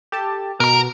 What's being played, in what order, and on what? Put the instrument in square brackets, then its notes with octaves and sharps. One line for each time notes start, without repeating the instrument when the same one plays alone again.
[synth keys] G4 A4 A5
[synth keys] B2 [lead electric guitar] A#4 A#5